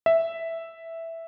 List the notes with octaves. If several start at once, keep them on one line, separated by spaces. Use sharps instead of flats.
E5